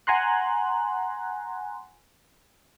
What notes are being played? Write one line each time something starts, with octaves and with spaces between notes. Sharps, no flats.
F#5 G#5 A#5 C6 F#6